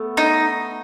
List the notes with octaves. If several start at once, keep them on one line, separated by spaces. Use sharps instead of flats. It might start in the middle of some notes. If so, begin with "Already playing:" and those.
Already playing: A3 B3
D#4